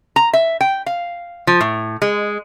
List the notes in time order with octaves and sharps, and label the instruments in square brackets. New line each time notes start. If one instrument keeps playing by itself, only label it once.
[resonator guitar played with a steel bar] A#5
E5
G5
F5
F3
A2
G#3